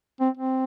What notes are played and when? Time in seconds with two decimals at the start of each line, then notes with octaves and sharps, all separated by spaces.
0.20 C4
0.37 C4